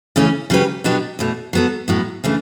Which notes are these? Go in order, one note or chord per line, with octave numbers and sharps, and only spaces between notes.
C#3 E3 A3 C#4
C#3 F#3 C#4 G4 B4
B2 F#3 B3 D4 G4
E2 B2 A3
F#3 B3 F#4 A4
A2 F#3 B3
C#3 E3 A3 D4